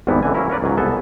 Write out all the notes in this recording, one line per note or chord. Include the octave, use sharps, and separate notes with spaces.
G#1 E2 G#2 G3 B3 E4
C#2 D3 E3 G#5
F#3 A#3 C#4 E4 A#4
C#4 A#4 B4 D5
C#2 G#2 F#3
C2 B3 A4 G#5